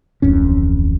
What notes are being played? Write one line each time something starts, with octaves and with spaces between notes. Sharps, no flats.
D1 A1 F2 C#4